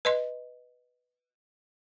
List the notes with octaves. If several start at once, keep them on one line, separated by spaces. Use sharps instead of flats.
B4 D#5 C6